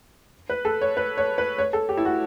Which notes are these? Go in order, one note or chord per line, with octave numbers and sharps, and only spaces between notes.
B4
A4
C#5
B4
C#5
B4
C#5
A4
G4
E4
F#4